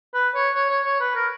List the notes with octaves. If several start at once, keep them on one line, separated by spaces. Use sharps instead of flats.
B4
C#5
C#5
C#5
C#5
B4
A#4